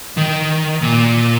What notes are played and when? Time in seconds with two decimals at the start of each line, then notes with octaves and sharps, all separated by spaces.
0.17 D#3
0.82 A#2